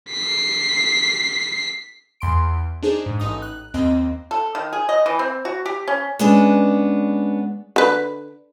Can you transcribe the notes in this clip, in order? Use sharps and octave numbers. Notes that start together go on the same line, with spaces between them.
B6 C7
E2 C6 D7
D4 D#4 G#4 C5
G#2
A1 D#4 D#6
F#6
D#2 C4 D#5
A4
D#3
G#4
D#5
E3
C4
F#4
G4
C#4
G#3 B3 C#4 D4
D3 B4